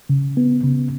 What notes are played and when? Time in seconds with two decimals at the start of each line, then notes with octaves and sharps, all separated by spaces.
0.09 C#3
0.37 B3
0.64 C#3